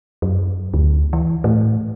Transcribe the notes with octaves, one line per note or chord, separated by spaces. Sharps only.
F#2
D2
E3
A2